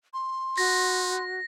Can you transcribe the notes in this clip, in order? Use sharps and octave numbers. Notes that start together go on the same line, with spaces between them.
C6
D#4 F#4 A#6